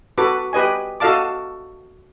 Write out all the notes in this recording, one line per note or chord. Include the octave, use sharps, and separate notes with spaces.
F#4 A4 B4 D6
G4 B4 D#5 G#5
F#4 A4 D#5 F5 A5 D6